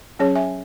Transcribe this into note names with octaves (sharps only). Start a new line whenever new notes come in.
F#3 C#4 G#4 C#5
E5 G#5